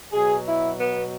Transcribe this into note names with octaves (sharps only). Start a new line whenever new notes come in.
B2 F#3 G#4
E4
B3